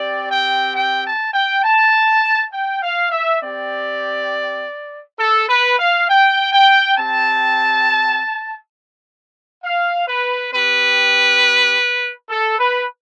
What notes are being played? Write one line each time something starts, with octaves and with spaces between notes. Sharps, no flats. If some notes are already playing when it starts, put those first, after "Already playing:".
Already playing: C4 G4 D5
G5
G5
A5
G5
A5
G5
F5
E5
C4 G4 D5
A4
B4
F5
G5
G5
C4 G4 A5
F5
B4
C4 G4 B4
A4
B4